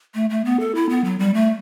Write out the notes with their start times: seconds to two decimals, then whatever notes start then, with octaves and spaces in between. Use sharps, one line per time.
0.14 A3
0.30 A3
0.45 B3
0.60 A4
0.75 E4
0.89 B3
1.04 F#3
1.19 G3
1.34 A3